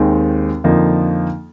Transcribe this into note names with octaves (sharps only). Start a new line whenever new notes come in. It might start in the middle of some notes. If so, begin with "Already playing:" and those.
Already playing: D#2 D#3 G#3 C4
F2 D3 F3 A#3 D#4